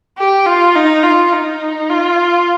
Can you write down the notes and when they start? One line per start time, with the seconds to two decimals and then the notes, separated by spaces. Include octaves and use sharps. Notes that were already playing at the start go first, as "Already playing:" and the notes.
0.18 G4
0.46 F4
0.75 D#4
1.03 F4
1.32 D#4
1.90 F4